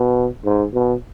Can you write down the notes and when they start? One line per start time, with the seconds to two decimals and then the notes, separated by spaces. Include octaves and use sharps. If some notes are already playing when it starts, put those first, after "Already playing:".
Already playing: B2
0.45 G#2
0.74 B2